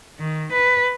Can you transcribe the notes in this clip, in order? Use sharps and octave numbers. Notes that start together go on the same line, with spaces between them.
D#3
B4